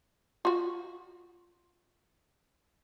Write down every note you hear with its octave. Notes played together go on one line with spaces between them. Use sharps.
F4 F#4